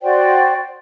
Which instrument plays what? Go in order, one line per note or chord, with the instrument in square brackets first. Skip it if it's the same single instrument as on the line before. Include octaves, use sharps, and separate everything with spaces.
[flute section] F#4 C5 D5 G5